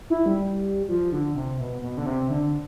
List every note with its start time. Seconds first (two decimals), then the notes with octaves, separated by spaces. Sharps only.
0.10 E4
0.26 G3
0.88 F3
1.12 D3
1.35 C3
1.59 B2
1.82 B2
1.97 D3
2.06 C3
2.30 D3